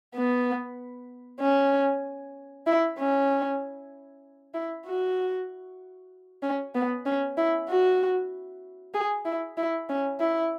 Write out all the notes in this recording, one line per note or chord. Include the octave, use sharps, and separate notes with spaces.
B3
C#4
E4
C#4
E4
F#4
C#4
B3
C#4
E4
F#4
G#4
E4
E4
C#4
E4